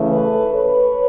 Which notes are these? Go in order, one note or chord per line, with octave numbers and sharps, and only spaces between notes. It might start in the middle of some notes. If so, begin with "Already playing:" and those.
Already playing: C#3 E3 A3
A4 B4
B4 C#5